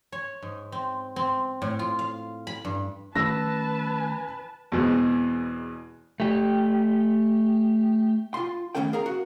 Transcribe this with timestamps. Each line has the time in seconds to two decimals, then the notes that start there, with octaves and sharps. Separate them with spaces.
0.12 C#5
0.42 G#2
0.72 C4
1.16 C4
1.62 A2
1.79 F4
1.99 F5
2.47 B5
2.65 G2
3.16 D#3 A3 C#4 B4 A5 E6 A#6
4.72 E2 B2 G#3 C4
6.20 A3 G4
8.34 F4 C6
8.75 A2 D#3 C4 C#4 A4 G5
8.93 G#4 A#4 F5 A#5
9.06 F#4